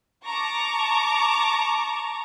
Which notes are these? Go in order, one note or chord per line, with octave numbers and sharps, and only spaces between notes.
A5 A#5 C#6 D6